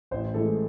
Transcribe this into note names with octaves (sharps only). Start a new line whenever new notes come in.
A1 C5
A2 E3 G#3 A4